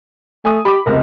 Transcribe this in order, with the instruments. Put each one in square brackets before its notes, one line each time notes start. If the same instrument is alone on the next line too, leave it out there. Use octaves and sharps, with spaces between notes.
[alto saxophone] A3 [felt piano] G#5 D#6
[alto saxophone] G4 [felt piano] B5 D6
[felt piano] F1 C#2 C3 [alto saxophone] A#4